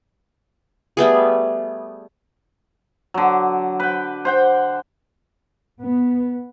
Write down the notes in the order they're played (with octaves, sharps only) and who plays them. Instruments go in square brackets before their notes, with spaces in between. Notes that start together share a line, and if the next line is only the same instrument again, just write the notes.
[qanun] G3 A3 B3 G#4
[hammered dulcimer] D3 F#3
B4 G5
C5 F#5 G5
[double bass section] B3